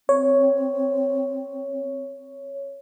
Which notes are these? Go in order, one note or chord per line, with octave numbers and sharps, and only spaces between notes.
C4 C#5